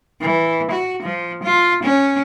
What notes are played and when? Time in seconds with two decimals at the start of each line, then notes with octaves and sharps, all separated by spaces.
0.21 E3
0.71 F#4
1.03 F3
1.44 F4
1.83 C#4